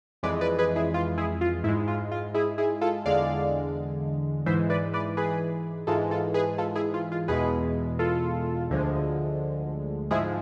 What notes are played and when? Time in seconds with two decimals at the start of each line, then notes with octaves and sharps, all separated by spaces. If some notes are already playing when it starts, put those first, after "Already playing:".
0.23 F2 E3 G#3 B4 D5
0.41 B4 D5
0.58 G#4 B4
0.76 E4 G#4
0.94 F4
1.18 E4 G#4
1.41 F4
1.64 G#2 E4
1.68 G#3
1.88 F4
2.12 F4
2.34 E4 G#4
2.58 E4 G#4
2.81 F4 A4
3.05 E2 D3 G#3 D5 F5
4.46 G#2 E3 G#3 C5 E5
4.70 B4 D5
4.93 B4 D5
5.17 G#4 B4
5.87 G#2 E3 G#3 F4 A4
6.11 F4 A4
6.34 G#4 B4
6.58 F4 A4
6.76 E4 G#4
6.94 F4
7.12 F4
7.28 E2 B2 G#3 G#4 B4
7.99 F4 A4
8.70 D2 D3 F3 G#3
10.11 G#2 F3 G#3 E4 G#4